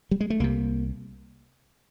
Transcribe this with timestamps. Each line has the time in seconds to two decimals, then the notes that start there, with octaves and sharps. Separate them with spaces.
0.11 G3
0.20 G#3
0.30 A3
0.40 C2 C3 A#3